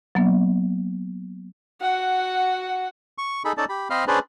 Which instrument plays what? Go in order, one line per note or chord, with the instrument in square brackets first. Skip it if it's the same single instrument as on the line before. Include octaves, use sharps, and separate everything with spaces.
[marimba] F#3 A#3 B3
[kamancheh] F#4 F#5
[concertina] C#6
D#4 G#4 A4 B5
C#4 D#4 A4 D5 A5
G4 B5
C4 C5 D#5 F5 B5 F6
C#4 D4 G#4 B4 C5 D5